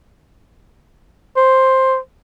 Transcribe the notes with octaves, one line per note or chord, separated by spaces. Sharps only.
C5